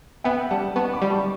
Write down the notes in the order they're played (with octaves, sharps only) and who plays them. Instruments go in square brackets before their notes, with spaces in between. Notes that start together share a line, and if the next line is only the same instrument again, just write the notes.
[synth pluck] B3 [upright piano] E5 G5
[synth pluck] G3 [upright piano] F#5 A5
[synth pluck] B3 [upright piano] A5 C#6
[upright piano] B5 D6
[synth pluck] G3
[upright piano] A5 C#6